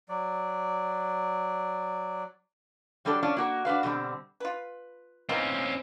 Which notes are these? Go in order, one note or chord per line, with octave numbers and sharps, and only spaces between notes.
F#3 D5
F#3 G3 D4 A4 D5
C#4 D4 F4
A#3 F#4 A#4
D4 F#4 B4 F5
B2 D3 G3 C4
F4 B4
D#3 E3 C4 C#4 F4